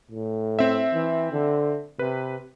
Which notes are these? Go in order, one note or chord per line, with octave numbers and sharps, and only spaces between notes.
A2
C4 E5
E3
D3
C3 B4